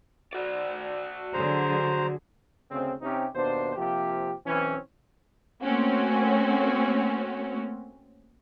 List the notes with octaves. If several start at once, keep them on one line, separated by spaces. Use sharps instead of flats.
F#4 D5
D3 F#3 G#4 C5 A#5
D2 C#3 C4
C3 C4 C#4 D#4 G4
D#2 B2 D4 C5
C3 F3 A#3 G4
B1 E3 C4 C#4
A3 A#3 C4 C#4 F#4